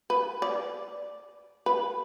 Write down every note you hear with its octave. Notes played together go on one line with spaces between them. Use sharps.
B4
D5
B4